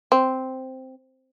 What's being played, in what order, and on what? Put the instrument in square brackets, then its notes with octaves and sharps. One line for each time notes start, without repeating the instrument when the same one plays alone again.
[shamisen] C4